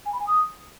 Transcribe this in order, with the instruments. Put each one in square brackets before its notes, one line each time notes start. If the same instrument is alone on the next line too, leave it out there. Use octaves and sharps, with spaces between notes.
[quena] G#5
B5
G#5
D#6